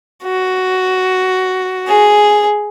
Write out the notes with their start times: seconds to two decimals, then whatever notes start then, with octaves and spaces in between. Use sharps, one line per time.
0.23 F#4
1.88 G#4